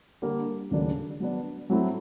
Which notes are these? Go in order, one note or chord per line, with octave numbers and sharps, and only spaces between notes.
D3 G3 A#3
D#2 C#3 F#3 A3 D4
F#3 B3 D4
A2 F#3 A3 C4 E4